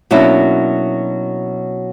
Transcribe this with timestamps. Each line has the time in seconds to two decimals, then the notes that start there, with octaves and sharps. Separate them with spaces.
0.11 B2 F#3 A#3 C#4 D4 E4